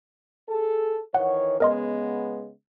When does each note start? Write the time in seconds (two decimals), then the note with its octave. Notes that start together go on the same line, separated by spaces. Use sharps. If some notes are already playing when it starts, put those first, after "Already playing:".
0.49 G#4 A4
1.14 D#3 E3 C#5 F#5
1.60 C#3 G#3 B3 A#4 D#5 C6